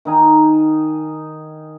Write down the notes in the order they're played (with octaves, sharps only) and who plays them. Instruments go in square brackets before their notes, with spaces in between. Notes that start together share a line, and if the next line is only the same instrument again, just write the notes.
[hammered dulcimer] D#3 D#4 G#5